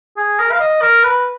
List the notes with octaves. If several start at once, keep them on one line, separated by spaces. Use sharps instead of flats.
G#4
A#4
F5
D#5
A#4
B4